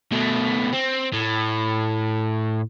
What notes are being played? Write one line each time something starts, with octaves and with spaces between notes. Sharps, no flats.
B2 A3
C4
A2